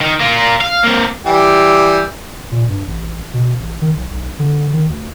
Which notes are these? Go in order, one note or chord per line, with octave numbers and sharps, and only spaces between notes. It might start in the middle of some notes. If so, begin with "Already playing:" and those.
D#3
A#3 F4
F5
A#3 C4
E3 G3 G4
A#2
G2
A1
B2
A1
D#3
B1
B1
D3
D#3
D2